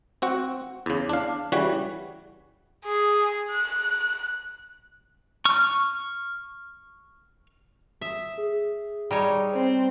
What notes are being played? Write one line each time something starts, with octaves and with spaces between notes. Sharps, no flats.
C4 F#4 F#5
E2 C#3
D4 F5
C#3 E3 G3 F#4
G#4
F#6
C#6 F6
E5 D#6
G#4
G3 D#4 C#5
C4